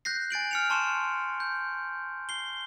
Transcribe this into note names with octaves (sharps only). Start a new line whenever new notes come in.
F#6 G6 A#6 C7
G#5 A6 D7 F#7
F6 C#7 F7
A5 C6 C#6 C#7 E7
G6
C7 G7